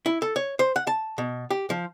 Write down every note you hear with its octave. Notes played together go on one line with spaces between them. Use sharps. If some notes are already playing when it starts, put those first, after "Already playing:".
E4
A4
C#5
C5
F#5
A5
B2
G4
F3